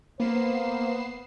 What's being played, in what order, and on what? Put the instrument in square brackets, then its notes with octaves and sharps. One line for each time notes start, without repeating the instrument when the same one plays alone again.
[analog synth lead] A#3 [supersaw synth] B3 C7 E7 [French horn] C5